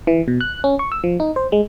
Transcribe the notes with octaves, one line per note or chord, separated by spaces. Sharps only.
E3
B2
F#6
C#4
C#6
E6
F3
D#4
C5
G#3